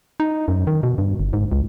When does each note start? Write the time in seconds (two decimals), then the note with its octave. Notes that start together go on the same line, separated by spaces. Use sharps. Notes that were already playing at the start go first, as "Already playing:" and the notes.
0.20 D#4
0.48 F#2
0.67 D#3
0.83 B2
0.98 G2
1.20 G1
1.33 G#2
1.52 C#2